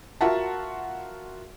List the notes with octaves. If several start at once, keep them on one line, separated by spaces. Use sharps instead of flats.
F4 F#4 A#4 E5 F#5 A5